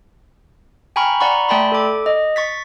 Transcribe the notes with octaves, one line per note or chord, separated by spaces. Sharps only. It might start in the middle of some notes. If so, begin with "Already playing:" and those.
G5 G#5 A#5 B5 C#6 F6
D5 F#5 A#5 B5 C#6
A3 D5 G5 A5 B5 C6
A4 D6
D#5
C#6 A6 B6